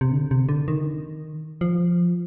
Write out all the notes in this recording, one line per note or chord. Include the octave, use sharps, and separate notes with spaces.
C3
D3
C3
D3
D#3
F3